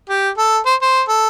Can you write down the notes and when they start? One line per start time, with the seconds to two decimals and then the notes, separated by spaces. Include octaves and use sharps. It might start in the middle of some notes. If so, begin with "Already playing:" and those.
0.09 G4
0.38 A4
0.66 C5
0.82 C5
1.09 A4